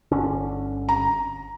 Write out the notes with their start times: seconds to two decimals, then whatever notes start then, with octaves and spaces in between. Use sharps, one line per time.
0.11 G1 D3 C#4
0.89 A#5